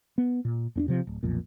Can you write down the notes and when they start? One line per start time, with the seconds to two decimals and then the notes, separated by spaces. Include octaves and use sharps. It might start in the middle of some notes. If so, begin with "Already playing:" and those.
0.18 B3
0.45 A#2
0.75 E2 C#4 D4
0.88 C3 F3
1.07 D1
1.23 B1 F2 A#2